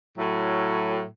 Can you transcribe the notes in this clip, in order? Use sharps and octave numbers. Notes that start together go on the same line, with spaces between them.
A2 F#3